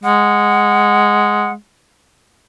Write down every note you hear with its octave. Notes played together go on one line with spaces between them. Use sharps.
G#3 F#5